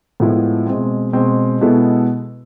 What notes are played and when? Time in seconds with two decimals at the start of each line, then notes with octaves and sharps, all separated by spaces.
0.20 A2 F3 G#3 B3 E4
0.67 B2 G#3 C4
1.13 B2 G#3 C4
1.61 B2 G#3 B3 E4 A4